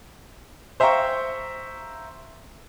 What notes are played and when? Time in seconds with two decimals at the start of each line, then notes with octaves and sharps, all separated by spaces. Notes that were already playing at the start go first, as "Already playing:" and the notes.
0.80 C5 E5 F5 G5 A#5 C#6